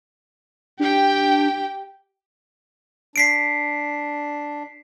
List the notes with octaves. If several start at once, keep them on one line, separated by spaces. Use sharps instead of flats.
D4 G4 G5
D4 B6 C7 D7